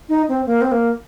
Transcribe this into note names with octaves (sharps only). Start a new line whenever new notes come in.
D#4
C4
A#3
C4
A#3